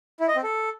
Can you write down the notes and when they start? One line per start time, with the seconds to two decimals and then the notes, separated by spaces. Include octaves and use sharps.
0.20 E4
0.28 D#5
0.36 C4
0.44 A4